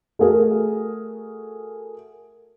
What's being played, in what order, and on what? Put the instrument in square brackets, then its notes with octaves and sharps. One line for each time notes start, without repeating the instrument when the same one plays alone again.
[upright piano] A3 F#4 G#4 A#4